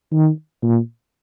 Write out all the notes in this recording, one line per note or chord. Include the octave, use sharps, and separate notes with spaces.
D#3
A#2